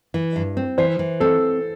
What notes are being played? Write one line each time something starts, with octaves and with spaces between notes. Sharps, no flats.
E3
G2
C4
E3 C5
E3
C4 A4